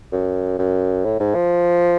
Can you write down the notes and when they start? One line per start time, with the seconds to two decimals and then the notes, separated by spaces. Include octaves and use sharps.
0.12 F#2
0.58 F#2
1.05 A2
1.20 G#2
1.35 F3